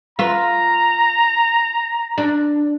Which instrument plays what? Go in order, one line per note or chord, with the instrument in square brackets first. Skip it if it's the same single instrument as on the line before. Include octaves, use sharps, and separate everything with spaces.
[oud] F4 B4 [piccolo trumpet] A#5
[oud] D4